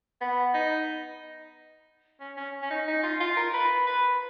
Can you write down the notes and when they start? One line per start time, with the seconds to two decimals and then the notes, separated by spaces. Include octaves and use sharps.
0.21 B3
0.54 D#4
2.20 C#4
2.37 C#4
2.62 C#4
2.70 D#4
2.87 D#4
3.03 F4
3.20 F4
3.36 A#4
3.53 B4
3.87 B4